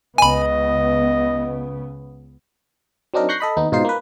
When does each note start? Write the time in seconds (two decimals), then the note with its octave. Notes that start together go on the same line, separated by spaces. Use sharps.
0.18 C#2 C#3 B3 D#5 G#5 B5
3.14 F#3 C4 D4 D#4 A#4
3.29 C#6 F#6 G6 A#6 C7
3.40 A4 D#5 B5
3.57 D#2 B3 D#4
3.72 G#2 B2 D#4 F4 C5 C7
3.85 A#3 B4